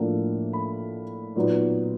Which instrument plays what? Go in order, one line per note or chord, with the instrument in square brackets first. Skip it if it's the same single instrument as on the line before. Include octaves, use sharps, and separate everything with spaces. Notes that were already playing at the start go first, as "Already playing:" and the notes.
Already playing: [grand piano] A2 F3 A#3 D4
B5
A#2 F#3 B3 D#4